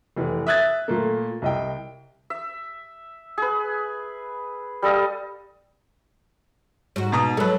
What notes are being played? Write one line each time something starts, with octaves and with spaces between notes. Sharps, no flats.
F1 E3
E5 D#6 F#6 G#6 A6
A#2 A3 A#3
C2 D#5 G5
E5
G#4 B4
G3 A4 D#5 F5
G#2 F#4
B2 A#5 D#6
F#3 G#3 A4 B4